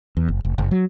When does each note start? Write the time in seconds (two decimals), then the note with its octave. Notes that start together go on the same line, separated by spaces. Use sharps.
0.17 E2
0.28 F#1
0.45 F1
0.58 F#1
0.71 F#3